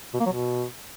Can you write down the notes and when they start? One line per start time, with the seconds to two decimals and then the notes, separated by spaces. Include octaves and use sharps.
0.14 B2
0.20 A#3
0.26 F#3
0.32 B2